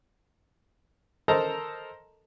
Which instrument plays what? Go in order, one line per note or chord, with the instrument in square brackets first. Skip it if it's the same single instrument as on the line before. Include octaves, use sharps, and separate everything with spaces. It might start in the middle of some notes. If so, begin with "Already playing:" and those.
[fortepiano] A4 A#4 C5 D#5 A5 A#5